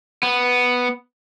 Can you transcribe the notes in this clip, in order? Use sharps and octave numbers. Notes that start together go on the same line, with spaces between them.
B3